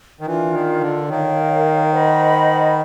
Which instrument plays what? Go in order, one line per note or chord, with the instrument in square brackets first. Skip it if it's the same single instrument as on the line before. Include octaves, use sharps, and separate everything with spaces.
[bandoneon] D#3
[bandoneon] E3 [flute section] D4 F4 A#4 D5
[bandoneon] D#3
D3
[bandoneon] D#3 [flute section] A#4 C#5 F5
[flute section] C5 D#5 F#5 B5